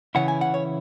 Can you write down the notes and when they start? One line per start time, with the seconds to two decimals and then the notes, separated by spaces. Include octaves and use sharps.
0.15 C#3 E3 C#4 E4 F#5
0.28 G#5
0.41 F#5
0.54 C#5